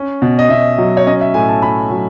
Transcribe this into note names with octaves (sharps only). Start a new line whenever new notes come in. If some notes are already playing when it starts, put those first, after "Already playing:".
Already playing: C#4
B2
D#5
B2 E5
F#3
C#5
C#4 D#5
E5
A2 G#5
A5
E4 B5
F#3